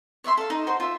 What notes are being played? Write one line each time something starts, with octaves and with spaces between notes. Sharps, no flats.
C#5 D5 E5 C6
A4 F5
D#4
F#4 C5
F4 E5